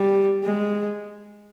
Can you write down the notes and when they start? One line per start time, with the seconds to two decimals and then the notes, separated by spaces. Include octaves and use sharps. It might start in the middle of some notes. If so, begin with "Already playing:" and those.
Already playing: G3
0.43 G#3